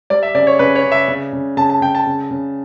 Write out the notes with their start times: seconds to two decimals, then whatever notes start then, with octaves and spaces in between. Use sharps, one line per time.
0.10 G3 D5
0.23 E5
0.35 C#3 D5
0.47 C#5
0.59 C#3 B4
0.75 C#5
0.83 C#3
0.92 E5
1.08 C#3
1.33 C#3
1.57 C#3 A5
1.69 A5
1.81 C#3 G5
1.95 A5
2.07 C#3
2.31 C#3